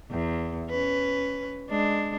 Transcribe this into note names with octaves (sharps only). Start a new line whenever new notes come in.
E2
C#4 B4
G#3 D4